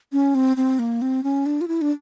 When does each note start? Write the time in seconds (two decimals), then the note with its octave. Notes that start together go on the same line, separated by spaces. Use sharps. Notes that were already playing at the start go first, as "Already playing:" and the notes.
0.13 C#4
0.35 C4
0.57 C4
0.79 A#3
1.02 C4
1.23 C#4
1.46 D4
1.61 F4
1.68 E4
1.81 D4